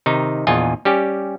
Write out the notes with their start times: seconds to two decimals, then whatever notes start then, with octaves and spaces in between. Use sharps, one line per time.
0.06 C3 D#3 D#4
0.47 A#1 E2 F4 D#5 G#5
0.85 G3 C#4 G4